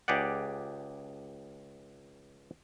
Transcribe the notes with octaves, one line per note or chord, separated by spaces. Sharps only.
C#2 G4 G#4 D5 F#5